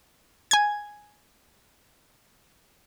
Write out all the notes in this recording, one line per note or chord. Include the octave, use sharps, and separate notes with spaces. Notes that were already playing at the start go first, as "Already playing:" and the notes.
G#5 G#6